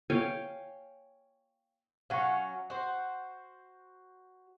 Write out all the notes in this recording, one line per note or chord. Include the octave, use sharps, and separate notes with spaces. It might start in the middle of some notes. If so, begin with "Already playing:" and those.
C#5 F5 G5 G#5
F#3 C#4 F5 F#5 C#6
F#4 C5